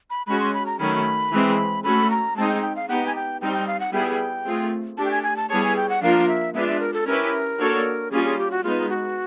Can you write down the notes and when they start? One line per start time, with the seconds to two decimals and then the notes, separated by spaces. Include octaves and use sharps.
0.10 B5
0.27 G#3 C#4 F#4 B5
0.40 C6
0.54 B5
0.66 A#5
0.79 D#3 F#3 A3 C#4 B5
1.32 E3 G#3 C4
1.84 A3 C#4 F#4 A4 B5
2.11 A#5
2.36 G#3 C4 D#4 A5
2.49 G5
2.62 G5
2.76 F5
2.89 B3 D#4 G4 F#5
3.07 G#5
3.15 G5
3.41 G3 C4 D#4 G5
3.53 G5
3.67 F5
3.80 F#5
3.93 G3 B3 E4 G#4 G5
4.46 A3 C4 F4 G#4
4.97 A3 D4 G4 A5
5.05 G5
5.11 G#5
5.23 G#5
5.37 A5
5.50 G3 B3 E4 G#4 C#5 A5
5.64 G#5
5.76 G5
5.89 F#5
6.02 F3 A#3 D4 F4 A#4 F5
6.28 E5
6.54 G#3 B3 D4 F4 E5
6.68 E5
6.80 A#4
6.93 A4
7.07 C#4 E4 G4 A#4 B4
7.59 A#3 D4 F#4 A4 C#5
8.11 G3 A#3 C#4 F4 G#4
8.25 G#4
8.38 G4
8.51 F#4
8.63 G#3 B3 D#4 F4
8.89 F#4